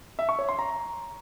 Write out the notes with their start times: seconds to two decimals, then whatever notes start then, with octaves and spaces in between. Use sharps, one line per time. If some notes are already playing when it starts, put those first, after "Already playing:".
0.19 E5
0.29 C#6
0.39 C#5
0.49 C6
0.59 A#5